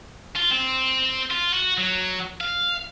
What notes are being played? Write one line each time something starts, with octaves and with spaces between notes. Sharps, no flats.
F4
C4
F4
F#4
F#3
F5